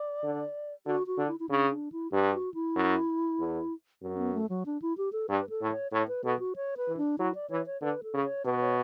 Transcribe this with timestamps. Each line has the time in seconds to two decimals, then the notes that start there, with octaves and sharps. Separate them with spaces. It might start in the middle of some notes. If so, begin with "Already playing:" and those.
Already playing: D5
0.23 D3
0.86 D3 F#4
1.07 F#4
1.17 D3
1.28 E4
1.40 E4
1.49 C#3 D4
1.70 D4
1.92 E4
2.12 G2 G4
2.34 F#4
2.54 E4
2.76 F#2
3.40 E2
4.02 F#2 C#4
4.18 B3
4.35 A3
4.49 F#3
4.66 D4
4.82 E4
4.98 G4
5.13 A4
5.29 G2 B4
5.50 A4
5.61 A2
5.72 C#5
5.92 A2 C#5
6.08 B4
6.24 B2 A4
6.39 F#4
6.56 C#5
6.77 B4
6.88 E3
6.97 D4
7.18 F#3 E4
7.35 D5
7.50 E3 C#5
7.66 C#5
7.82 D3 B4
8.03 A4
8.14 C#3
8.24 C#5
8.45 B2 B4
8.61 C#5